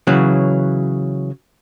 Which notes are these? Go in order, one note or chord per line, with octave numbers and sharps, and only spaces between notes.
C#3 E3 F#3